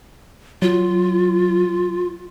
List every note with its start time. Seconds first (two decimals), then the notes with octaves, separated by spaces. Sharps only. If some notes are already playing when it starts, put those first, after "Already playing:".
0.62 F#3 F4